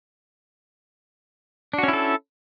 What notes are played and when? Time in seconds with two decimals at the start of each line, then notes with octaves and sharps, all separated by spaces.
1.74 D4
1.78 F#4
1.83 C#4
1.88 E4
1.93 A4